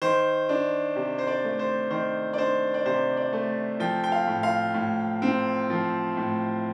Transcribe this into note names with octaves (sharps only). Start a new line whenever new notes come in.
D#3 C5
D4
C3
C5
D5
A3
C5
D#3 C5
D5
D4 C5
D5
C3 C5
D5
A3
F3 G5
G5
F5
A2
F5
A2
C4
F3
A2